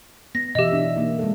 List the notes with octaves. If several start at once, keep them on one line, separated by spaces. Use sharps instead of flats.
B3 A#6
B2 E3 G4 D#5 E5
D4
A#3 D#4
G#3 A4